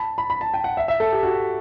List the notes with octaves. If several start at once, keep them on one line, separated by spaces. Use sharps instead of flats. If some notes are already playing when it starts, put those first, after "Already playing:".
Already playing: A5 B5
B5
B5
A5
G5
F#5
E5
E5
A4
G4
F#4